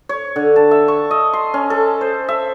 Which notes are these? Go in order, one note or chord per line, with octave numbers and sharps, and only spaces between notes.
C#5
D3
A5
E5
C#6
D#5
C6
C#4
A4
C5
E5